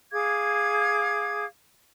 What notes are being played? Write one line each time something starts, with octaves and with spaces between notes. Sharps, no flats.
G#4 F5 D6 G#6